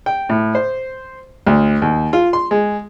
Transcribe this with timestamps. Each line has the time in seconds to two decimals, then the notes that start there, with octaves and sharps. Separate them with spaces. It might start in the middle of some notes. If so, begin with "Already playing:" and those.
0.06 G5
0.29 A2
0.55 C5
1.46 D2
1.82 D#2
2.13 F4
2.33 C6
2.51 G#3